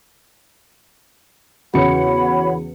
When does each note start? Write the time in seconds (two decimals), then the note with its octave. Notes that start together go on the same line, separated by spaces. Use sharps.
1.74 E2 C#3 F#4 C#5 F#5 B5 C#7